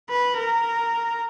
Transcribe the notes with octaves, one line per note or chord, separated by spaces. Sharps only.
B4
A#4